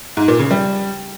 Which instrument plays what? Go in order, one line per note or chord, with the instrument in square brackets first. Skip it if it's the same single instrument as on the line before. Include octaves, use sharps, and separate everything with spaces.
[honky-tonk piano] G#2
A#2
C#3
G3